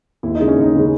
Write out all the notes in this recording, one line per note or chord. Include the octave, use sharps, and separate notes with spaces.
D#2 E4
D#4
C#3 G#3
C#4
D#2 D#4
C#3 G#3